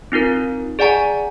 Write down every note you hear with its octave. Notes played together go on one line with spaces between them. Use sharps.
C4 D#4 F4 A#4
G#4 D5 F#5 G#5 A#5